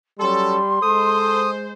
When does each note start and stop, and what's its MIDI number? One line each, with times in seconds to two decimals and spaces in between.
0.19 0.58 54
0.19 0.79 55
0.19 0.58 61
0.19 0.58 69
0.19 1.47 84
0.82 1.73 56
0.82 1.53 69
0.82 1.73 72
0.82 1.51 87